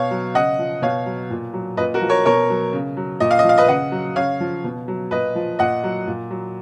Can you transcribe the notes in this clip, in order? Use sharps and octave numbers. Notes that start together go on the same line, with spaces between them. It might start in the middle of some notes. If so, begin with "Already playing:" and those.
Already playing: B2 C#5 F5
F#3
C#3 D#5 F#5
F3
B2 C#5 F5
F#3
A#2
F#3
A#2 B4 D#5
F#4 A#4
F3
A#4 C#5
B2 A#4 C#5
F#3
C#3
F#3
A#2 D#5
F5
D#5
F3 F5
B4 D#5
C#3 D#5 F#5
F#3
C#3 C#5 F5
F3
B2
F#3
A#2 B4 D#5
F3
A#2 D#5 F#5
F#3
A#2
F#3